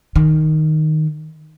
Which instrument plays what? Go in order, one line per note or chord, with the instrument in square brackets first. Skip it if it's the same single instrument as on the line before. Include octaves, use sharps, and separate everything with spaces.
[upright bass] D#3